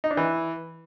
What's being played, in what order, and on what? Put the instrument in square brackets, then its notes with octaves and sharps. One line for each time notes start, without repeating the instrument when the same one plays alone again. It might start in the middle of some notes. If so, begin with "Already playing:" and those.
[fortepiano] D#4
D4
E3